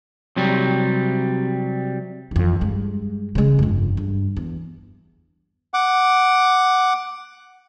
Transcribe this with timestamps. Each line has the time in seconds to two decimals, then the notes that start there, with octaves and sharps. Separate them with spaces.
0.36 C3 F#3 G3
2.31 F2 E3
2.61 G2 G#3
3.35 C#3 G#3
3.59 G1 F2
3.97 G2
4.37 E2
5.74 F#5 D6